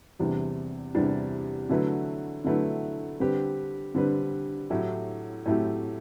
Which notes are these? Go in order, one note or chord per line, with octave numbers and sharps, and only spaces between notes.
E2 C3 E3 G3 D4
E2 C3 E3 G3 D4
D3 F#3 A3 E4 B4
D3 F#3 A3 E4 B4
D3 G3 C4 G4 B4
D3 G3 C4 G4 B4
A2 F#3 A3 E4 G4
A2 F#3 A3 E4 G4